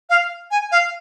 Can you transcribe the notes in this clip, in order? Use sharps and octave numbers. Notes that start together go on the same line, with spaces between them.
F5
G#5
F5